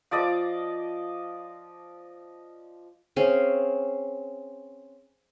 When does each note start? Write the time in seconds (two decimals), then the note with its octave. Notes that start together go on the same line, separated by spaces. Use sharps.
0.11 F3 D5 D#5 D6
3.16 C4 C#4 G#4 F5